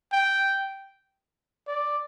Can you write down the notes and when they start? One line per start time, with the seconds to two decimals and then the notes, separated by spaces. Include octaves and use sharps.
0.13 G5
1.67 D5